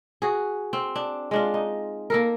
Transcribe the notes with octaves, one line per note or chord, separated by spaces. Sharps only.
F#4 G#4
C4
D4
G#3 D4 F4
D#4
A#3 A4 A#4